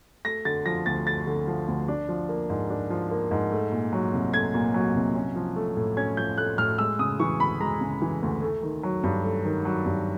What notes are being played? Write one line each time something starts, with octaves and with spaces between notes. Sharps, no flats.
A3 A#6
D3 A6
F3 A#6
D2 A6
A3 A6
D3
F3
D2
D4
F3
A#3
G#2
D4
F3
A#3
G#2
A3
A#2
F#3
C2
A3 G#6
A#2
F#3
C2
C#4
F3
A3
A2
C#4 G#6
F3 G6
A3 F#6
A2 F6
G#3 E6
C#3 D#6
E3 C#6
D2 B5
G#3 A#5
C#3
E3
D2
A3
D#3
F#3
G2
A3
D#3
F#3
G2